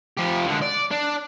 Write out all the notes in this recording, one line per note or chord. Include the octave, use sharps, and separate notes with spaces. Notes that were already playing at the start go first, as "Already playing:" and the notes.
F3 G4
D3 G#3
D5
D4